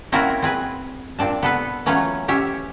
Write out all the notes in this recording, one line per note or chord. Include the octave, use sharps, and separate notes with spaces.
A#3 C4 C#4 E4 F#4 A#4
C4 G#4 B4
A#2 C4 D4 A5
B3 A4 B4
E3 F#3 A3 C#4 F4
C#4 G4 C#5 E5